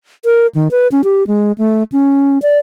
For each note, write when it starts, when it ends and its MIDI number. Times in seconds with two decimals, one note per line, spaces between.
0.25 0.47 70
0.55 0.68 51
0.71 0.88 71
0.92 1.02 61
1.04 1.27 67
1.27 1.52 56
1.58 1.83 57
1.92 2.39 61
2.42 2.58 74